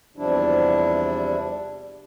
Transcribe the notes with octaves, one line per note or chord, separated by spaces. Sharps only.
E2 C3 F3 G3 D4 E4